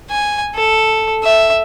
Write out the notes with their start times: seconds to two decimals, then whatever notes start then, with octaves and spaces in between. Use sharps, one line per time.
0.11 G#5
0.55 A4
1.24 E5